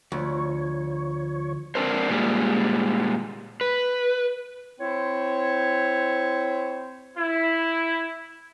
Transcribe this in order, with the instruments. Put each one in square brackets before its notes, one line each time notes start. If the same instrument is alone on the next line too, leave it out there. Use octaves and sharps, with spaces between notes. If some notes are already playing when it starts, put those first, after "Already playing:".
[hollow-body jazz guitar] D2 [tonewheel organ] F3 C#5
[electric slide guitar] C4 D4 A#4 C5
A#2 G3 G#3
B4
[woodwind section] C4 E4 C5 C#5
[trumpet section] E4